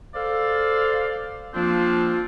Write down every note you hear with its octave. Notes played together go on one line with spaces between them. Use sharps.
A4 C5 D5 F5
F3 A#3 C4 D4 F4